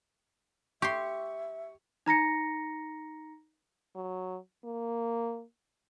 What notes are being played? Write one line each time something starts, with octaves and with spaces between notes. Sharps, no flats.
G4 E5 C6 C#6
D#4 A#5 A#6 C#7
F#3
A#3